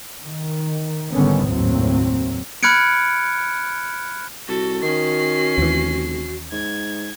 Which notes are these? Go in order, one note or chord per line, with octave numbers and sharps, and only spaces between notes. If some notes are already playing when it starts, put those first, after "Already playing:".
D#3
G#1 D3 D#3 G3 B3 C#4
F#1 D#2 A2 F#3 C4
B5 F6 F#6 G#6 C#7 D7
C2 F#4 A4
D#3 C#4 C7
F1 D#2 E3
G#2 G#6